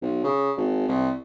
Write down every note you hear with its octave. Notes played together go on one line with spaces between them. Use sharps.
B1
C#3
G#1
C2